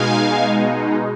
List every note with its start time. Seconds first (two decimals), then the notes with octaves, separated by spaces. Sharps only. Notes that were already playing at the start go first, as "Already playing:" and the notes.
Already playing: B2 G#3 D#4 F5 G#5